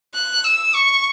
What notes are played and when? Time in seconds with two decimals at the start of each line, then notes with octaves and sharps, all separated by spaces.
0.14 F#6
0.44 E6
0.75 C#6